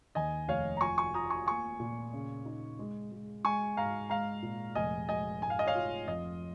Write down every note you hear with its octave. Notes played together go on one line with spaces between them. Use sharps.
D#2 D#5 G#5
F1 C#5 F5
A#5
F4 G#5 C#6
G#5 C#6
F4 A#5 D#6
G#5 C#6
A#3 G#5 C#6
A#2
C#3
D#4
G#3
G#3
G#3 G#5 C#6
G#2 F5 A#5
G#3 F5 A#5
A#2
F1 D#5 G#5
G#3 D#5 G#5
G#2 G#5
F5
D#5
C#5 F5
F4
F2 D#5